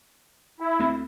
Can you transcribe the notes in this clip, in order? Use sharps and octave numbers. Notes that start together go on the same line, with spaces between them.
E4
D2 A3 C4